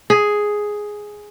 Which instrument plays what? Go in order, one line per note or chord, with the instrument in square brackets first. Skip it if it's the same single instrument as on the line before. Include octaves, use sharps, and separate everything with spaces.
[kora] G#4